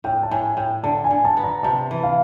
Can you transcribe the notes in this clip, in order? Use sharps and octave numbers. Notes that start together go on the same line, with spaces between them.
A2 G5
A5
A2 G#5
A2 G5
D3 A5
G#5
D3
A5
B3
A#5
C3 A5
E3
F5